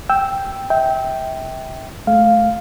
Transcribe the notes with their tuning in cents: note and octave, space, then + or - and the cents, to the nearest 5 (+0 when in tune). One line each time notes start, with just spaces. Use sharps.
G5 +0 E6 +0
E5 -30 G5 -5
A3 -30 F5 +0